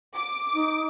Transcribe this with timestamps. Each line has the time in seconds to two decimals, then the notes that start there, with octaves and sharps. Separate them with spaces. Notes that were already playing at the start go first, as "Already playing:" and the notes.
0.15 D6
0.54 D#4